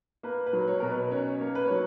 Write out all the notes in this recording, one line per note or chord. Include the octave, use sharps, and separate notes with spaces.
A#3 B4
B4
F#3
C#5
B2 A#4
B4
C#4 C#5
A#3
B4
F#3 C#5